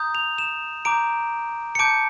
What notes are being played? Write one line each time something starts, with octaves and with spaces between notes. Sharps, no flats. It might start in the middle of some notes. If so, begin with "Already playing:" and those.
Already playing: A#5 D#6 G6
F7
E7
A#5 D6 G6 D7
C#7
A5 D6 G6 D7